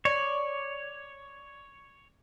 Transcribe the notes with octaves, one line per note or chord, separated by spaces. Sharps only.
C#5 D5